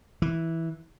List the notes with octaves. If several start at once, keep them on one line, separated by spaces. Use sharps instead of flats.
E3